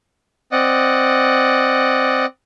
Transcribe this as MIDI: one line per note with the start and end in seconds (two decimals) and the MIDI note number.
0.52 2.26 60
0.52 2.26 74
0.52 2.26 75
0.52 2.26 78